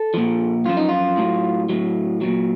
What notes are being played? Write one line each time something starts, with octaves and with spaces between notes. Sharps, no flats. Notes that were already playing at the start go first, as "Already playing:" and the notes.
Already playing: A4
A#2 F3
F#2 F3 F4
D#4
F4
A2 F#3
A2 F#3
A#2 F#3